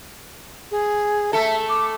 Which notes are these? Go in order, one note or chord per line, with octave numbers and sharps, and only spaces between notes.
G#4
A3 A4 E5
D6